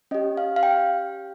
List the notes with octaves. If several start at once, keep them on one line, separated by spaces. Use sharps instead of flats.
C#4 G4 D#5
F5
F5
G5